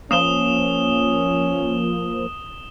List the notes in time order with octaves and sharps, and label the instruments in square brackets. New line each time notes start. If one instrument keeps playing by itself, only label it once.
[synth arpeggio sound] F3 A#3 [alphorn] C#4 [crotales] D#6 E7 G7